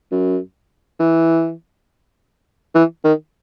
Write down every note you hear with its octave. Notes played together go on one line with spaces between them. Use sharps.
F#2
E3
E3
D#3